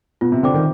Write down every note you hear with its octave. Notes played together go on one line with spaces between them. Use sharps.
B2 F4
C3
D3 C5 G5 D6
D#3